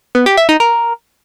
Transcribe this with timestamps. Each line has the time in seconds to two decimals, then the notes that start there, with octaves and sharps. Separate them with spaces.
0.15 B3
0.26 G4
0.37 E5
0.49 D#4
0.60 A#4